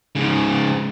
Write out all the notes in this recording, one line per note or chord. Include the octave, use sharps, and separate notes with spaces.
G#2 C#3